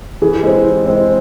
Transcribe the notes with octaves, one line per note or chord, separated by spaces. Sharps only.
E3 G#4
G4
G#3 C4 G#4
E3
G#3 C4